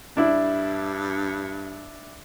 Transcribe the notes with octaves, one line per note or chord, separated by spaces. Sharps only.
G2 D4 E4